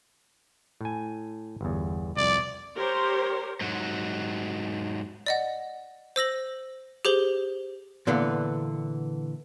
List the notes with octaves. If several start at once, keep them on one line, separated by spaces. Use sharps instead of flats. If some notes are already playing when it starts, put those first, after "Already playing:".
A2 G#5
G1 E2
C2 F2 D5
G4 A#4 C5 C#5
G#2 F#3
D5 D#5 F#5
C5 E6 A#6 F#7
G4 G#4 C5 G7
A#2 D3 E3 B3